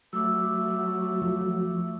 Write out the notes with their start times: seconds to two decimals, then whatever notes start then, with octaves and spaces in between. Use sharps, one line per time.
0.13 F#3 A3 D6 E6
1.22 F2 F3